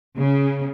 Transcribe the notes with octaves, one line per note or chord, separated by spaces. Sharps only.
C#3